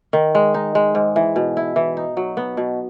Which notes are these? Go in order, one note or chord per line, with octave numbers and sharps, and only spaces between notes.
D#3
G#3
D#4
G#3
G#2
E3
B2
E4
E3
D#4
F#3
B3
B2